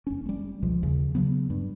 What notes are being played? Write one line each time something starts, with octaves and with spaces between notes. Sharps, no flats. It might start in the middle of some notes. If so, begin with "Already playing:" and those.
F1 C#4
G3 A3
C#2 B2 F3
D#2 C#3
C#3 F#3 B3
G2